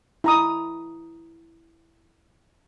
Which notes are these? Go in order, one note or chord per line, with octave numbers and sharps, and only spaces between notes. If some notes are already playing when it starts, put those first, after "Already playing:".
E4 A#5 D#6